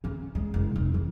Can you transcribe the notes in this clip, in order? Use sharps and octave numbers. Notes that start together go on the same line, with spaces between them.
D3 C#4
G#3
F#1
F1
E3